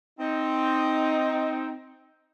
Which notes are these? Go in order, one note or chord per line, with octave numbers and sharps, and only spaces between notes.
C4 D#4